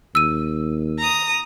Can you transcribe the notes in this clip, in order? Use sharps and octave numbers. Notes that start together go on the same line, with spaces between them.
D#2 E6 D#7
A#5 D#6